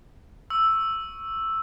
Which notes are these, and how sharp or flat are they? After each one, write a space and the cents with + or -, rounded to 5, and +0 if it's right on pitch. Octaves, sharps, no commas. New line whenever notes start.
C#6 +0 E6 +0